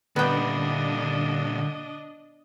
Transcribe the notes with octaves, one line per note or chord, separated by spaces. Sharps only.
A#2 D3 G3 B3 D4 D#5 G5